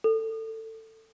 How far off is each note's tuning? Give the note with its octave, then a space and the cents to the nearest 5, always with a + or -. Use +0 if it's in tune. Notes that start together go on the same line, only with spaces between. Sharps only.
A4 +20